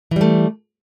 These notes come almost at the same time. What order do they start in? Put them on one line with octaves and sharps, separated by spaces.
E3 G3 A3